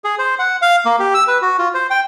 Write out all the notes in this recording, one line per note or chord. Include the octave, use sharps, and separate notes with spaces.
G#4
C5
F#5
F5
A#3
G4
E6
B4
F#4
F4
C5
G5